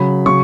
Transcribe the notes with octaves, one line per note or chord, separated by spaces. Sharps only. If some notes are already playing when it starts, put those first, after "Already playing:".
Already playing: C#3 F#3 B5
C#3 F#3 C#6